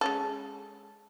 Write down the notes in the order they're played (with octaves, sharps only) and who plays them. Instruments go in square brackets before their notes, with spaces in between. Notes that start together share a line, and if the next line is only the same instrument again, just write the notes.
[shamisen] G#3 C#4 A4